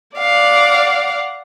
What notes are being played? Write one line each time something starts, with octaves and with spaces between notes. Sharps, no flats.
D5 F5 F#5